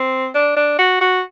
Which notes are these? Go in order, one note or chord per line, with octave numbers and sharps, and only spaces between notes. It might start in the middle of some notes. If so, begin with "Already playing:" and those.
Already playing: C4
D4
D4
F#4
F#4